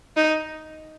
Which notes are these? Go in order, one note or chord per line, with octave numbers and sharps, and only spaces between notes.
D#4